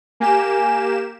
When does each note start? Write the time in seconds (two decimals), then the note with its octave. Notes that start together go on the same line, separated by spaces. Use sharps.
0.20 A#3 G4 G#5 E7